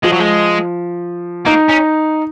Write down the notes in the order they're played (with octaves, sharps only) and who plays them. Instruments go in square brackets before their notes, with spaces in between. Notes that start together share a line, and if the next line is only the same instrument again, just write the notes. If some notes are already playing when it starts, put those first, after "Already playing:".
[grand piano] F3 [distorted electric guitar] G#3
[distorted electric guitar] F#3
G#3
[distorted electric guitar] A#3 [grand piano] D#4
[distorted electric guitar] C#4